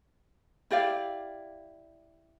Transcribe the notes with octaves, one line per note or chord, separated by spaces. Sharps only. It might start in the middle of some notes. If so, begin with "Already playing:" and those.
E4 G4 D5 F5